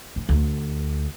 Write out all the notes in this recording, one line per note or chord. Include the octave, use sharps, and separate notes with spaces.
E3
D2